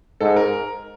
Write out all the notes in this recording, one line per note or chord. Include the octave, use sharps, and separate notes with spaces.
G#2 A4
A#4